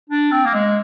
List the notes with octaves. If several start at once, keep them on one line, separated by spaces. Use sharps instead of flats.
D4
C4
A#3
G#3